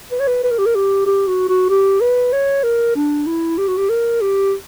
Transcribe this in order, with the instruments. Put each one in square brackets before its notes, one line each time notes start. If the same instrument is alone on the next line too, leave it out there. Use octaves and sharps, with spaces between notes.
[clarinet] B4
C#5
B4
B4
A#4
G4
A#4
G4
G4
F#4
F#4
G4
B4
C#5
A#4
D4
E4
G4
F#4
G4
A#4
G4